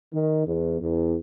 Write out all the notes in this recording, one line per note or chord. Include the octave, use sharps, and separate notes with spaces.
D#3
E2
E2